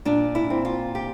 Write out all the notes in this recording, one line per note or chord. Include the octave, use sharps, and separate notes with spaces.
A#2 D4
E4
C4
F4
G4